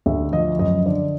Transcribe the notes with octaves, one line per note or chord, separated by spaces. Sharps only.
D2 E5
F3 D#5
F#2 D#5
D3 D5